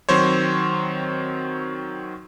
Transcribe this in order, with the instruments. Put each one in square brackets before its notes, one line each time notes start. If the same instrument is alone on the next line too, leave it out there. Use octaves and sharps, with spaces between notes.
[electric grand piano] D#3 F#3 C4 C5 C#5